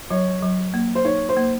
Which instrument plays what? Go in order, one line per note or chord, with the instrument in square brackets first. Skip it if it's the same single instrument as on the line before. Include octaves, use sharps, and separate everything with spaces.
[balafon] F#3 [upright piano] C#5
[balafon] F#3
A#3
[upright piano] C5
[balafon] D#4 [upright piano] C#5
[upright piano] C5
[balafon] A#3